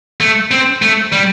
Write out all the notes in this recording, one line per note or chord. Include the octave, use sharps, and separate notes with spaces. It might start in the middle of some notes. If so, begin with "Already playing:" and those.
A3
C4
A3
G3